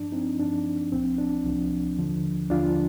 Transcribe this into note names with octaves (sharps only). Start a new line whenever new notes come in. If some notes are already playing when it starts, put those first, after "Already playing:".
Already playing: G2 F3 D4
C4 D#4
G2 F3 D4
C2 A#2 F3 C4
D4
C2 A#2 F3
D#2 D3 F3
D#2 D3 F3 D4 F4